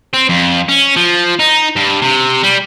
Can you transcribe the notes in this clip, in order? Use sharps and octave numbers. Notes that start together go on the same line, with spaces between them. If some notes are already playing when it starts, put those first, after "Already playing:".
C4
F2
C#4
F3
D#4
G2
C3
G3